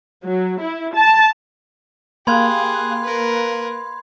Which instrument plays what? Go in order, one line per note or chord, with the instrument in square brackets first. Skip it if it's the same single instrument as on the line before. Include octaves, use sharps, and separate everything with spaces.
[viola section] F#3
E4
A5
[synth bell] A#3 F5 F#6 [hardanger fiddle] G4 G#4 [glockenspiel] B5 C6 G#6
[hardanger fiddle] A#4 B4